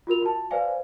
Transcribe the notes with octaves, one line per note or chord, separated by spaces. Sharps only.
F4 F#4 A#4 F7
F#4 A5
B4 C5 D5 F5 G#5